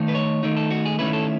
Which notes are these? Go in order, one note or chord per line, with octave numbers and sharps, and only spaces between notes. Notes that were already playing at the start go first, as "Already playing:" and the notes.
Already playing: D#3 A3 D#4
B4
C#5
D#3 A3 D#4
A4
F#4
G#4
D#3 A3 C#4 E4 B4
A4